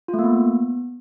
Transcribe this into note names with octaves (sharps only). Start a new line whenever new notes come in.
F4
A3
A#3
B3